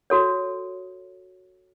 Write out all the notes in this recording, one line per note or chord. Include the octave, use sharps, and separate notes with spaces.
F#4 A4 C#5